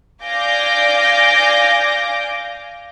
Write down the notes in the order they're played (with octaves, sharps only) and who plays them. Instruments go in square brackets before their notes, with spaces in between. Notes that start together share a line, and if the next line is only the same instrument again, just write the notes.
[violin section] D5 F5 G#5 D6 G6 A#6